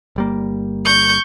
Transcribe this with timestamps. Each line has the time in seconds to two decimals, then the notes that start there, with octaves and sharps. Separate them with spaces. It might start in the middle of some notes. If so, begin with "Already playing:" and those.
0.16 G1 G3 A#3
0.86 C#6 G6